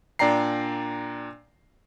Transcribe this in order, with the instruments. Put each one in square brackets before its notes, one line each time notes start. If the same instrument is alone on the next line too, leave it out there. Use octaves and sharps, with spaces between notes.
[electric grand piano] A#2 D4 D5 G5 A#5 C7